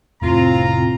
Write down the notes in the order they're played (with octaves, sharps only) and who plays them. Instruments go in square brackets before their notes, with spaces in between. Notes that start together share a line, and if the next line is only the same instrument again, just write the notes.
[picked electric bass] F1 A2 [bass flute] C4 [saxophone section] F4 [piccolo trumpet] A#5